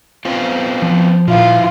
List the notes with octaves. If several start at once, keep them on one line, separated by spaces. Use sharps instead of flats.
B3 C4 F4
F3
A#2 F3 E4 F4